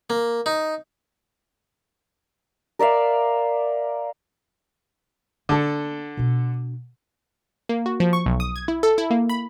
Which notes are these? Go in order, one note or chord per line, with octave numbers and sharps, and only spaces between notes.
A#3
D#4
A#4 D5 E5 F5
D3 A#3 B3 A4
B2 D4
A#3
F#4
F3
C#6
B1
D#6
G#6
E4
A4
E4
A#3
B5